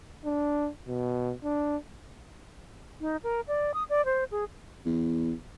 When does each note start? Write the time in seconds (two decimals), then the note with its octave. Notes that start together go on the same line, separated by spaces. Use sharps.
0.25 D4
0.88 B2
1.44 D4
3.01 D#4
3.24 A#4
3.48 D5
3.74 D#6
3.90 D5
4.05 C5
4.31 G#4
4.86 E2